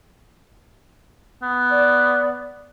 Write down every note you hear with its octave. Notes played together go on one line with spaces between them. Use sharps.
B3
D5